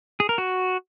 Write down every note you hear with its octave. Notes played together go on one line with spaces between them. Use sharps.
G#4
A#4
F#4